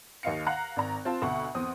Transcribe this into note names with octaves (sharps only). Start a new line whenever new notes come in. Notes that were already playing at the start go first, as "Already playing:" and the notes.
D#2 D#5 F5 C#7
F5 F#5 A#5 F#6
G#1 D5 A#5
C4 F4 A5
D2 B2 F#5 C#6
E2 C4 D#6